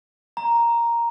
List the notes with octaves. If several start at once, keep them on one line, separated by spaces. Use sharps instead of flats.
A#5